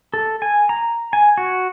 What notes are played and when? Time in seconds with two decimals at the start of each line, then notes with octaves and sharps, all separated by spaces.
0.14 A4
0.42 G#5
0.69 A#5
1.13 G#5
1.38 F#4